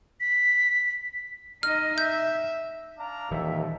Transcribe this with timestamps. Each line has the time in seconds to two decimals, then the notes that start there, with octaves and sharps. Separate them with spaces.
0.20 B6
1.63 D#4 D#5 F6
1.98 E5 G6
2.97 D4 F5 A#5
3.31 D#1 D#2 E3 F3 E5